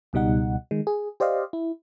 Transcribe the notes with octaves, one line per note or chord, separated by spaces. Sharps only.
C#2 B2 G3 D#4 F#5
D#3 G#3
G#4
G4 C5 D5 D#5 F5
E4